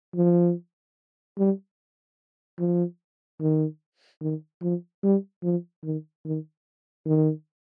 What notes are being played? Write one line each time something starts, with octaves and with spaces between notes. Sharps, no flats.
F3
G3
F3
D#3
D#3
F3
G3
F3
D#3
D#3
D#3